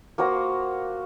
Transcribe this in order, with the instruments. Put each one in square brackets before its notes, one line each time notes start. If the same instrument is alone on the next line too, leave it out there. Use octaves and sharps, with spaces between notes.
[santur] A#3 F#4 C5 A#5